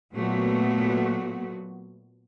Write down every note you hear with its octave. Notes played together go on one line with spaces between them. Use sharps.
A#2 F#3 A3 B3 F#4